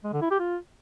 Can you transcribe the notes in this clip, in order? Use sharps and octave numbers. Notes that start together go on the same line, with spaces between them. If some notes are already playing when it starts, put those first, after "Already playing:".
G#3
D3
E4
G4
F4